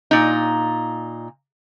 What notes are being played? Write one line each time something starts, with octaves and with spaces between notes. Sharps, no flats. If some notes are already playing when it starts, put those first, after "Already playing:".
A#2 D#4